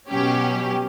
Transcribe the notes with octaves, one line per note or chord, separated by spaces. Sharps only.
B2 F#3 C#4 G4